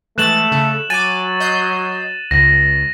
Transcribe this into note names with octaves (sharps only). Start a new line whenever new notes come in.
E3 G#3 A3 F#6 A6 E7 F#7
C#3 A4
F#3 G#5 D6 A6 D#7
D#5 G6 C7
C#2 A#6